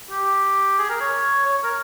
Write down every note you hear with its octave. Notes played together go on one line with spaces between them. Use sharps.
G4
G#4
A#4
C#5
C#5
A#4